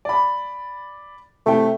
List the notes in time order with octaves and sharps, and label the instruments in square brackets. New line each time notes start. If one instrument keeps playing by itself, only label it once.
[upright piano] D5 B5
[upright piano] C3 E4 G5 [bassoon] A3